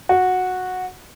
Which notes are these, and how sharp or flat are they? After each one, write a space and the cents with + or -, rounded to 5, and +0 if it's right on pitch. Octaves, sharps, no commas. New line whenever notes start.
F#4 -10